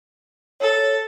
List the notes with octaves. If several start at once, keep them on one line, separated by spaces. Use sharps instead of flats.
A4 C#5